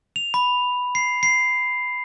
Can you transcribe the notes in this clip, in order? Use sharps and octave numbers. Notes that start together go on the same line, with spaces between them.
F7
B5
C7
C7